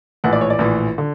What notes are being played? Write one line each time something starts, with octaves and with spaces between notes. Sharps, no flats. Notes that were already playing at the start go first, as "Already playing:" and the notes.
A#1 A2 E3 F#5
D5
C#5
D5
A#1 A2 E3
D3